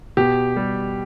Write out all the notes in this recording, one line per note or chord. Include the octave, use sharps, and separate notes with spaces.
B2 G4
G3